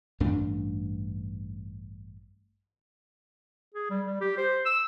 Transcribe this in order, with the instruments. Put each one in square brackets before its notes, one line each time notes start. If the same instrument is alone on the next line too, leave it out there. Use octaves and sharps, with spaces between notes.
[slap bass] A1 G2 A3 D4
[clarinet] G#4
G3
G3
G4
C5
E6